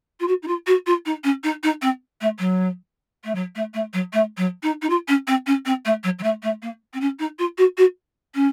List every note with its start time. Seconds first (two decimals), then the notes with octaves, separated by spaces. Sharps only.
0.20 F4
0.27 F#4
0.42 D#4
0.47 F4
0.66 F#4
0.86 F4
1.05 D#4
1.23 C#4
1.43 D#4
1.63 D#4
1.82 C4
2.21 A3
2.39 F#3
3.24 A3
3.35 F#3
3.55 A3
3.74 A3
3.93 F#3
4.13 A3
4.37 F#3
4.63 D#4
4.82 D#4
4.89 F4
5.08 C#4
5.27 C4
5.46 C#4
5.65 C4
5.85 A3
6.03 F#3
6.19 F#3
6.23 A3
6.42 A3
6.62 A#3
6.93 C4
7.00 C#4
7.19 D#4
7.39 F4
7.58 F#4
7.77 F#4
8.34 C#4